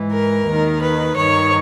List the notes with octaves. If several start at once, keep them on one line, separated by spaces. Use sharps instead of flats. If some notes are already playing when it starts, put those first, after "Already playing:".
Already playing: G#2 E3
A#4
D#2 D#3
B4
G2 D#3 C#5